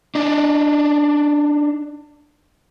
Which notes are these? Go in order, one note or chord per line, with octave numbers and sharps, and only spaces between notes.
D4 D#4